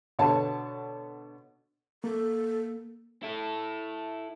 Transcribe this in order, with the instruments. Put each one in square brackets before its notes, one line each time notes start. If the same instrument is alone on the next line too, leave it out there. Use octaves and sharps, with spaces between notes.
[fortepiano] B2 D3 C#5 A5
[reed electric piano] A#3 [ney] A4
[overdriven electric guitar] E4 A4